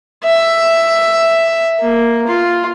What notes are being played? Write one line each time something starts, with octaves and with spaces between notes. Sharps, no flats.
E5
A#3
F4